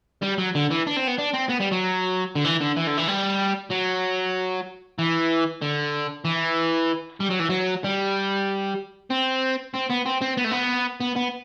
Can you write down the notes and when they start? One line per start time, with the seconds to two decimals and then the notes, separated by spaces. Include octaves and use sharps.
0.23 G3
0.38 F#3
0.55 D3
0.70 E3
0.87 D4
0.96 C4
1.07 B3
1.18 D4
1.33 C4
1.49 B3
1.60 G3
1.71 F#3
2.35 D3
2.45 E3
2.61 D3
2.77 E3
2.87 D3
2.98 E3
3.08 G3
3.71 F#3
4.99 E3
5.62 D3
6.25 E3
7.20 G3
7.30 F#3
7.40 E3
7.50 F#3
7.84 G3
9.11 C4
9.74 C4
9.90 B3
10.06 C4
10.22 C4
10.37 B3
10.44 A3
10.51 B3
11.00 B3
11.16 B3